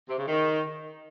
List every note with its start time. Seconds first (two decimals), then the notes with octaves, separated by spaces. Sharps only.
0.07 C3
0.17 C#3
0.27 D#3